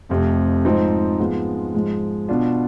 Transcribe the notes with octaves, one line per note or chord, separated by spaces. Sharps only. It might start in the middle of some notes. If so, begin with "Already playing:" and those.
F1 F2 C3
G#2 F3 C4 D#4
G#2 F3 G#3 B3 F4
G#2 F3 G#3
B2 B3 D4 F4